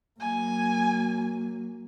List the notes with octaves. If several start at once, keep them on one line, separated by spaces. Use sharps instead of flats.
F#3 A#3 G#5